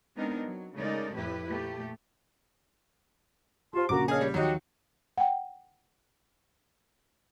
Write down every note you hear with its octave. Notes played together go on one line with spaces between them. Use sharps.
G#3 B3 C4 D4 D#4 A#4
F#3
C#3 G#3 A3 D#4 A#4 D5
F2 A2 E4 G4 B4
A#2 A3 G4
F4 G4 C5 A5 C6
A#1 C#3 A#3 F#4 A#5 D6
G#4 A4 C#5 D#5 F5
G3
D#2 F3 F#3 D#4 F#4 G4 G5
F#5 G5